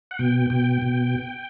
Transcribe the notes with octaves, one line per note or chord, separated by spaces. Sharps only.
F#5
B2 G5
B2 G5
B2